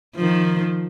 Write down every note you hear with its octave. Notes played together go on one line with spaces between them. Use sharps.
D#3 F3